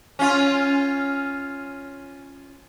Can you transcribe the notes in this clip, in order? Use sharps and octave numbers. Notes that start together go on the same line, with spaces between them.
C#4 F4